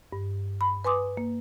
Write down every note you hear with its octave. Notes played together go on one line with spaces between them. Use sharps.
G2
B5
B4 G#5 C6 D6 D#6
A#3